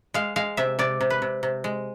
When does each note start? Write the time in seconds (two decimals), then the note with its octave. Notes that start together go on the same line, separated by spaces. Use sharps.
0.14 G#3 F5
0.36 G#3 F5
0.57 C3 E5
0.79 C3 D5
1.01 C3
1.10 B4
1.22 C3
1.43 C3
1.64 G#3